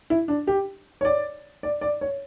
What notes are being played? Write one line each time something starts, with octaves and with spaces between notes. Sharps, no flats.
E4
D4
G4
C#5
D5
D5
D5
C#5